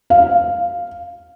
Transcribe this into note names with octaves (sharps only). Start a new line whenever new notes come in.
F5